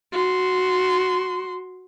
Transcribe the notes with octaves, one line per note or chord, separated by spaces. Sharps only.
F#4 C6